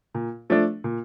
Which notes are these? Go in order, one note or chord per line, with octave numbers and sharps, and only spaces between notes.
A#2
F3 A3 D4
A#2